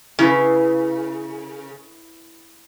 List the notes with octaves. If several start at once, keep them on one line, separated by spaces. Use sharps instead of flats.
C#3 E4 B4